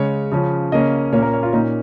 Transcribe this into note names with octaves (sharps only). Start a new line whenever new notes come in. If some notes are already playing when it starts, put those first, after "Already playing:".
Already playing: C#3 G#3 C#4 C#5
C#3 F3 C#4
C#3 A#3 C#4 D#5
A#2 A#3 C#4 C#5
A#4
C#5
F4
A#2 A#3 C#4 D#4